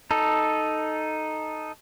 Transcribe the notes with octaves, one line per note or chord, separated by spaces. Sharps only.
D#4 A4